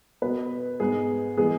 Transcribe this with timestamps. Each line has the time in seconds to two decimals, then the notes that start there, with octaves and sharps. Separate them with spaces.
0.22 B2 B3 B4
0.80 G#2 G#3 B3 G#4
1.37 E3 G#3 B3 G#4